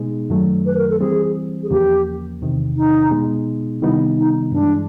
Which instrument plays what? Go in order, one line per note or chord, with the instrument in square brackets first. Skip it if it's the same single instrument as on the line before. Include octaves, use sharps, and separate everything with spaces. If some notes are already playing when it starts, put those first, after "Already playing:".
Already playing: [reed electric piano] B2 G#3 B3 D#4 G#4
F#2 D#3 F#3 A3
[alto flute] B4
A#4
A4
[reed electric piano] E3 G3 C4 [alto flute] G#4
[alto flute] G#4
[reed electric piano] E2 C#3 F3 A#3 [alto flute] G4
[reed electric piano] E2 C3 D#3
[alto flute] D#4
[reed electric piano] B2 G#3 B3 D#4 G#4
[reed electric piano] C3 D#3 G3 B3 D#4 [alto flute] E4
[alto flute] D#4
[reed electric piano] G2 E3 G#3 [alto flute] D4